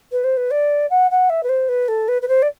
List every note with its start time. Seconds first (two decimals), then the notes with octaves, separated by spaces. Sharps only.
0.12 B4
0.24 C5
0.37 B4
0.51 D5
0.90 F#5
1.11 F#5
1.30 E5
1.43 B4
1.49 C5
1.69 B4
1.88 A4
2.08 B4
2.22 B4
2.28 C5
2.42 D5